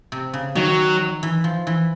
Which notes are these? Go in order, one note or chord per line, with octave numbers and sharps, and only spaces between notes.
C3
C#3
D#3 F#3
E3
F3
E3